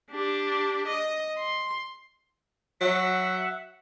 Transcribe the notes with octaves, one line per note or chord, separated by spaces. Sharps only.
D4 G4
D#5
C6
F#3 E5 F#5